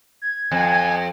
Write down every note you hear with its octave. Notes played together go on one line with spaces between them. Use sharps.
G#6
F2 G#5